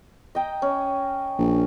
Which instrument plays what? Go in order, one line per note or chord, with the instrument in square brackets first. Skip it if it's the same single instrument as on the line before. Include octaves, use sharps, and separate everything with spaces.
[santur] D#5 G5 A#5
C#4
[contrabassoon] A#1